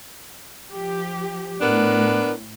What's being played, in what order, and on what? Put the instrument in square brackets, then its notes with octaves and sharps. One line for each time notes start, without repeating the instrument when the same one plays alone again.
[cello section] F3 G4
[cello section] A2 [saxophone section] B3 D4 A#4